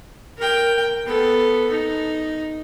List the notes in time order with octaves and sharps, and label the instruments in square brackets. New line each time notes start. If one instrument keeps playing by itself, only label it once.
[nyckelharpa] A#4 G5
B3 A4
D#4